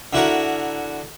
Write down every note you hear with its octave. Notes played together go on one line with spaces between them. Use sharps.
D3 E4 F#4 A#4